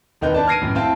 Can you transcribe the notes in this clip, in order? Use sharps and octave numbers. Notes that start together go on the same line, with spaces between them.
E1 D#3 C4 D#4 B4 G6
B3 D4 B4 D5 A5
F6 G#6 A#6 C7 D7 D#7
F#2 A2
C4 E4 F5 G5 A5